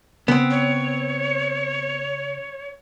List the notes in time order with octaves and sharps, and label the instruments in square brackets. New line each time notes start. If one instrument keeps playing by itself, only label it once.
[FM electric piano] C#3 [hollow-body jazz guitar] B3 C4
[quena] C#5